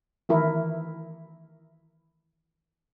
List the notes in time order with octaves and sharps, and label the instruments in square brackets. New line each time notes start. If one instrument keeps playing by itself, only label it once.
[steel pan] D#3 E3 E4 A#4